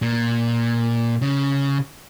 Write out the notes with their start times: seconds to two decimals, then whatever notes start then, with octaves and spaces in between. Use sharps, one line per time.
0.02 A#2
1.22 C#3